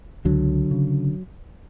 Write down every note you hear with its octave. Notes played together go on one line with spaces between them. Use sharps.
C#2 D3 F#3
C#3